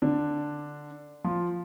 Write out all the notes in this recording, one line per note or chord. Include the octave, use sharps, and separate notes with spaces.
D3 D4
F3 F4